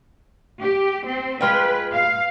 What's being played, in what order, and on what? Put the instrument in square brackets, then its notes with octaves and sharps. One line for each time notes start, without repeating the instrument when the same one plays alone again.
[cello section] G4
C4
[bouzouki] G#3 F4 G5 [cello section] B4
[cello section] F5